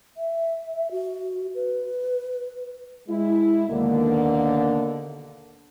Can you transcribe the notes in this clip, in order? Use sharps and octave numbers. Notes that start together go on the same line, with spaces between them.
E5
F#4
B4
G#3 E4
D#2 B2 D3 A#3